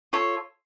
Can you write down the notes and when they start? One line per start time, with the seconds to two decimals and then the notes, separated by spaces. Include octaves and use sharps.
0.13 F4 A4 C#5